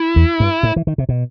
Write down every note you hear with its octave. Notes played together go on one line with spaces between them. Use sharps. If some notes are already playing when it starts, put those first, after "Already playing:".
Already playing: E4
E2
G2
A2
E3
D#3
C3
B2